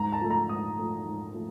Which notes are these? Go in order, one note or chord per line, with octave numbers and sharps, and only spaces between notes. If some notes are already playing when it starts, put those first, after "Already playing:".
Already playing: G#2 A#5
A5
F3 A3
A#5
G#2 D#6
F3 A3
G#2
F3 A3